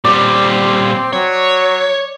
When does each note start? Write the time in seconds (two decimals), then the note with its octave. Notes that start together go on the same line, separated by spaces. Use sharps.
0.04 A#2 G3 C4 D5
1.13 F#3 C#5